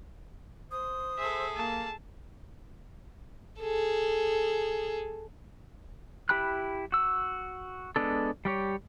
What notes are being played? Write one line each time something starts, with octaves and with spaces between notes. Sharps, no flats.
C5 D#6
G#4 A4 E5
A#3 A5
G#4 A4
E4 G4 G5 B5 F#6
F#4 E6
G#3 B3 D4 A4
G3 G4 C#5